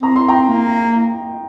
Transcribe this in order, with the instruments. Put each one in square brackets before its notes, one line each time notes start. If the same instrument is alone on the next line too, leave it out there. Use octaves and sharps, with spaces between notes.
[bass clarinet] C4 [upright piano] A#5
[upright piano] C6
G5 A#5
[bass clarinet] A#3